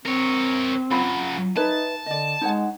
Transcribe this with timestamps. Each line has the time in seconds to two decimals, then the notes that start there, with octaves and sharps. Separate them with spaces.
0.06 C4 A#4 C#5
0.91 C#3 F#3 F4 B5
1.56 D#4 B4 C#5 E5 A5
2.06 D3 D5 D#5
2.41 G#3 D#4 C#5 F#5